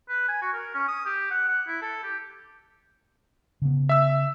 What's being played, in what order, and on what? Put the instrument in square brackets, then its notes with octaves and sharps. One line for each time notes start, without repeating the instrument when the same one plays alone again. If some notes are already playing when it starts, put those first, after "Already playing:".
[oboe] B4
G#5
F#4
A#4
C#4
D#6
G4
F#5
F#5
E4
A4
G4
[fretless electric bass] C#3 B3
[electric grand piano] E5 E6